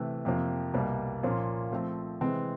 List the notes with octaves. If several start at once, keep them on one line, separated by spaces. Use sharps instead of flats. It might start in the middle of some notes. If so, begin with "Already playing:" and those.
Already playing: C3 E3 A3
F2 C3 F3 A#3
C2 B2 G3 A#3
A#2 F3 A#3 C#4 F4
F3 A3 C4
C3 E3 G#3 C4